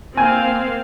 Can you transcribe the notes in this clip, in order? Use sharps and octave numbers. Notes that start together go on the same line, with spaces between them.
A#3 C4 F5 G#5